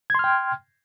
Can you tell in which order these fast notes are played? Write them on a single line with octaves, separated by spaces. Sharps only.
G#6 C6 F6 G5